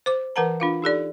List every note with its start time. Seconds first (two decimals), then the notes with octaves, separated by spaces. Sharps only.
0.06 C5 D6
0.36 E3 A#4 B4 F#5 A5 A#5
0.60 D4 F4 F5
0.82 D#4 G4 A4 D5